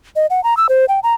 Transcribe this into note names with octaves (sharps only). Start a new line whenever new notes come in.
D#5
F#5
A#5
E6
C5
G5
A#5